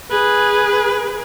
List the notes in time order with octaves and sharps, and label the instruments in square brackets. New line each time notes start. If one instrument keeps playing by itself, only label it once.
[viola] G#4 B4